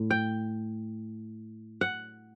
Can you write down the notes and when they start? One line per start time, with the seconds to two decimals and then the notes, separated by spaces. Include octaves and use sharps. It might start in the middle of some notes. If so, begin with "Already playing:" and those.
Already playing: A2
0.10 G5
1.81 F#5